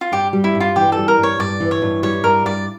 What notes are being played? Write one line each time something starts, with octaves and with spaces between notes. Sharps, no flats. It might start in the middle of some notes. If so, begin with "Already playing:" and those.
F4
G2 G4
G3
E4
G2
F4
E3 G4
A4
G3
A#4
G2
C#5
G2 D5
E3
C#5
G2
G3 C#5
G2 A#4
G2 D5